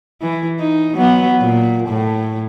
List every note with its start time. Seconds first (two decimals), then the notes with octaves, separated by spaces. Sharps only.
0.22 E3
0.60 D#4
0.94 F#3 B3
1.40 A#2
1.88 A2